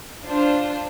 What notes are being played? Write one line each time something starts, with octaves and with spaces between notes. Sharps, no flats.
D4 F4 C5